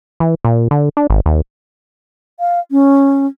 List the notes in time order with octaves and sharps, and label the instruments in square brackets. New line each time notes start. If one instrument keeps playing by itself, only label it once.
[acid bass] E3
A#2
D3
D4
G#1
D#2
[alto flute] F5
C#4